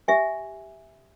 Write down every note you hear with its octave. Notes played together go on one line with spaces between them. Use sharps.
G4 E5 G#5